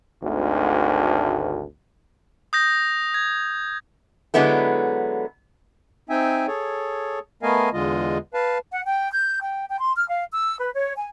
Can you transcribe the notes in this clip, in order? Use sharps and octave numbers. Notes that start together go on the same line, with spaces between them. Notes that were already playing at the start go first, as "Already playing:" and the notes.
G#1 D2
D#6 G6 A#6
G#6
D3 F#3 G#3 B3 E4 A4
C4 D#4 E5 G5 G#5
G#4 A4 C#5
A3 B3 A#4 D#5 F5 G#5
E2 D3 G#3 F4 D#5
B4 F5 A5
F#5
G5
G6
G5
G5
C6
F6
F5
E6
B4
C#5
G#5